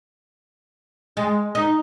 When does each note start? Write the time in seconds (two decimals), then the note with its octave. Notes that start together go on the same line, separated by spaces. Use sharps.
1.17 G#3
1.55 D#4